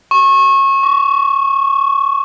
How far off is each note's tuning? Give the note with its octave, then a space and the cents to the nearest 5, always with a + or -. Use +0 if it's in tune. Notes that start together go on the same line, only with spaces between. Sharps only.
C#6 -25
C#6 +30